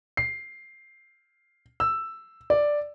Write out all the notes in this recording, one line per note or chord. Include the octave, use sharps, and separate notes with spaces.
C7
E6
D5